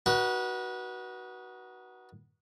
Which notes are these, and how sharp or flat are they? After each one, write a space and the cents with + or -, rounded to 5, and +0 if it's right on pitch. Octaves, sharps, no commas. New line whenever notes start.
D#4 +0 F#4 +15 B4 -25